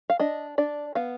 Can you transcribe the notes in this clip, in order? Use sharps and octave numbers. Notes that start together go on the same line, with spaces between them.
F5
D4 D#5
D4 D5
B3 F5